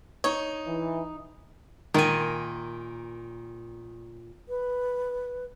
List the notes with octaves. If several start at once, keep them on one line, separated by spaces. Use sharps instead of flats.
D#4 C#5
E3
A#2 D#3 G#5
B4